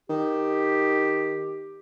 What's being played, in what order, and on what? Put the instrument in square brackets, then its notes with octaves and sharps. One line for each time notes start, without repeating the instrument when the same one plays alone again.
[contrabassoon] D#3 [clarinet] G4